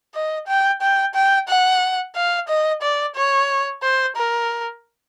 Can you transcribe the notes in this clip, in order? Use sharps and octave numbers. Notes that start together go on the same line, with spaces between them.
D#5
G5
G5
G5
F#5
F5
D#5
D5
C#5
C5
A#4